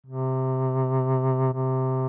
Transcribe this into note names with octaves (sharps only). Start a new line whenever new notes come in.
C3
C3